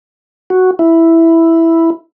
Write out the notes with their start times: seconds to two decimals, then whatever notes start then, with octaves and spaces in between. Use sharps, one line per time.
0.50 F#4
0.79 E4